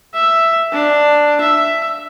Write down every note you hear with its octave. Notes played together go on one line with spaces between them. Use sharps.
E5
D4
E5